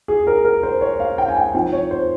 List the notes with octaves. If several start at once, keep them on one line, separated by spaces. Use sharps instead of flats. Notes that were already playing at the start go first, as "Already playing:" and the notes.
G#4
A#4
A#4
C5
C#5
F5
G5
G#5
G5
F3 C4 D#4 G5
C#5
C5